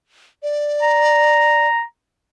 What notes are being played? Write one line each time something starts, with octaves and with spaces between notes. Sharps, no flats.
D5
A#5